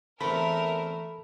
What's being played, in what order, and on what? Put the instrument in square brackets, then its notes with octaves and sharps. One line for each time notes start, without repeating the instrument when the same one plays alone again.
[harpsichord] E2 C4 [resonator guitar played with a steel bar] A3 [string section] A#4 E5 [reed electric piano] B5